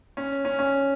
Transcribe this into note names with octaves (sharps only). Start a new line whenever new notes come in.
C#4
C#4
C#4